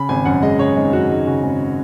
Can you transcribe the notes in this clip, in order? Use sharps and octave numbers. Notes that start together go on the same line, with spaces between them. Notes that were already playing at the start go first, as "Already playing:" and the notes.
Already playing: C#3 B5
G#1 G#5
F#2 F#5
G#3 D#5
C#3 C#5
G#1 D#4
F#2 F#4
G#3 D#4
C#3 F#4
G#1 G#4